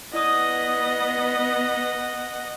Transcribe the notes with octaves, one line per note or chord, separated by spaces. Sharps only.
B3 E4 D5 D#5 F#5 D#6